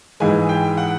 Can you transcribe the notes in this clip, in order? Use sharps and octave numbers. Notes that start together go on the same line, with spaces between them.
G#2 E3 G#3 G#5
G5
F#5